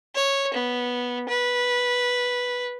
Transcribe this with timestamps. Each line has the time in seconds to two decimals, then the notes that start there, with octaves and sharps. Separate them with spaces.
0.15 C#5
0.54 B3
1.29 B4